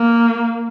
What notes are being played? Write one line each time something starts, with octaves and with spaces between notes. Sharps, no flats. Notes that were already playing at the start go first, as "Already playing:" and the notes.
Already playing: A#3